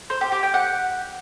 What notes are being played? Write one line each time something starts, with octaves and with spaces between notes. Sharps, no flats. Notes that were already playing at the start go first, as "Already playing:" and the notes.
C5
G4
G4
G5
F#5